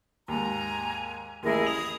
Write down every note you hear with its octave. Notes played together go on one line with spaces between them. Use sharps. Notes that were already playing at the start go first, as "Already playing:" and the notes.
D#2 G#2 G#5 A#5
A1 D#2 E4 G#4 A#4
D#6 F7